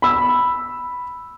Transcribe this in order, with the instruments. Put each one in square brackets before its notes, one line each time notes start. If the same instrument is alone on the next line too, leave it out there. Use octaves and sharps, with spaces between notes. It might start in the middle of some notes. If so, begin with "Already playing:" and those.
[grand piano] B5 E6